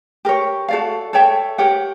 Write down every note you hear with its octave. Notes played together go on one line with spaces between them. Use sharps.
G4 A#4 C#5
F#4 A4 D5 F5
A4 C#5 E5 G5
G4 A#4 C#5 F#5